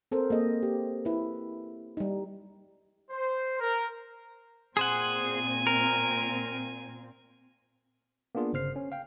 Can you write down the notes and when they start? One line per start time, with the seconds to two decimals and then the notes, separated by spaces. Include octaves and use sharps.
0.12 C4 A4 A#4 C5
0.30 A#3 G#4 D#5
0.63 G4
1.05 E4 B4
1.97 G3 D#4
3.10 C5
3.60 A#4
4.77 A#2 C4 G#4 C5 F#5 G#5
5.67 A#4
8.35 A#3 B3 D4 F4 G#4
8.53 G1 C#3 C5 F6 C7
8.76 C#4
8.92 F5 G5